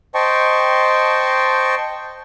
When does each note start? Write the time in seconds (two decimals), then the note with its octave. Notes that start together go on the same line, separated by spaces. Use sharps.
0.15 C5 D#5 G5 A5 C#6